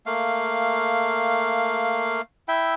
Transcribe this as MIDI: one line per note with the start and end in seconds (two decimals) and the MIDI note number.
0.06 2.21 57
0.06 2.21 58
0.06 2.21 77
2.48 2.75 64
2.48 2.75 76
2.48 2.75 79